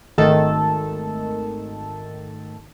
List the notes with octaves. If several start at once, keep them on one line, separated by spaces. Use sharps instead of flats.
G#1 D#3 A3 A4 A5